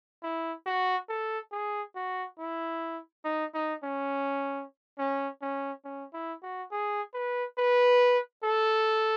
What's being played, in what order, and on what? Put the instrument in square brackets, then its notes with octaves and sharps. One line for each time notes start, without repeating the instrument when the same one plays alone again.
[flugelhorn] E4
F#4
A4
G#4
F#4
E4
D#4
D#4
C#4
C#4
C#4
C#4
E4
F#4
G#4
B4
B4
A4